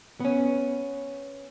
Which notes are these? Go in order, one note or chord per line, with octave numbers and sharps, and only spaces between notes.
B3 C#4